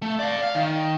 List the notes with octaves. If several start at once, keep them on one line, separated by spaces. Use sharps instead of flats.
A3
D5 F5
F5
D#3